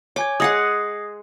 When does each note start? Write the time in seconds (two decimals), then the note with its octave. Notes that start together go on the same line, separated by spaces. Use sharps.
0.16 C#5 G#5 D6 G#6
0.40 G#3 G#4 F#5 D#6 A#6 C7